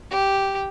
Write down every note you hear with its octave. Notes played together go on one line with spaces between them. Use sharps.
G4